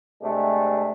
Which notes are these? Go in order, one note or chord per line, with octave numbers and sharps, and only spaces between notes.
C3 G#3 A3 D4